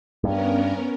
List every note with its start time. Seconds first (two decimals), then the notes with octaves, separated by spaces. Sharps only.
0.24 G2 B3 C#4 A#4